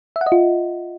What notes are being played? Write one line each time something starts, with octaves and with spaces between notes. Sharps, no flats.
E5
F#5
D#5
F4